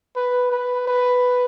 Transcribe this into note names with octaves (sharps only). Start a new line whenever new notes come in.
B4
B4
B4